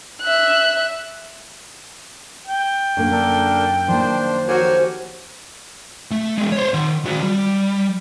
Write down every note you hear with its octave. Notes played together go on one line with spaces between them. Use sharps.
E5 F#6
G5
F#2 D3 A#3
D4 A4 A#4
D#3 F3 A#3 D4 C5
F#4 G4 A4 A#4 C5 C#5 G#5
A3
G#3 B3
C5 C#5
D#3 C6
D#3 F#4
G3